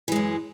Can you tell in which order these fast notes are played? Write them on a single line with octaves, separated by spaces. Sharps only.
E3 G#3 F#2